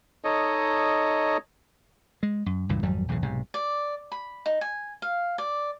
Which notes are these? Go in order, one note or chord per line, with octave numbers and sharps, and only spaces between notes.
D#4 A4 C#5 D#5
G#3
F#2
C#2 G2 A#2 E3
G#1 F2 F#3 G3
B1 E2 A2 C#3
B1 G#2 C3
D5
B5
D#4
G#5
F5
D5